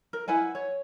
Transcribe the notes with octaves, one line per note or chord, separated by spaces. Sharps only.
A#4
E4 B4 F#5 G#5
C#5